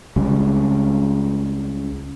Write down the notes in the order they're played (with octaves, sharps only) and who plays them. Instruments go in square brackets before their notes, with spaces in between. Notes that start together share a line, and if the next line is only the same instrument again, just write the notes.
[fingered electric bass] C#2 C#3 G3 G#3